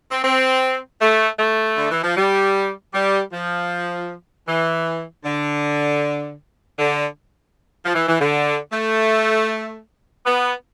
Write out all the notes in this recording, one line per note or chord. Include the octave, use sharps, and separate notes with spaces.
C4
C4
A3
A3
D3
E3
F3
G3
G3
F3
E3
D3
D3
F3
E3
E3
D3
A3
B3